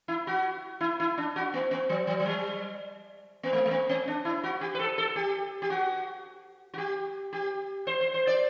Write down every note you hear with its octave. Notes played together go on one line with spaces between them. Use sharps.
E4
F#4
E4
E4
D4
F#4
B3
B3
F#3
F#3
F#3
G3
B3
A3
A3
B3
C4
D4
E4
F#4
G4
B4
A4
A4
G4
G4
F#4
F#4
G4
G4
C5
C5
C5
D5